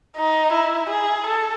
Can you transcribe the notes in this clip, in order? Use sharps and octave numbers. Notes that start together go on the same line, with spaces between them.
D#4
E4
G#4
A4